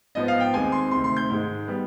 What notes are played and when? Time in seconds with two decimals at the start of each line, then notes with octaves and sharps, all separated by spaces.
0.15 G#2 F3 B3 D#5
0.28 F5
0.40 G5
0.53 D#2 D#3 G#3 C4 G#5
0.72 C6
0.91 D2 C3 D#3 C6
1.04 C6
1.16 G6
1.30 G#2 D#3 G#3
1.67 G3 B3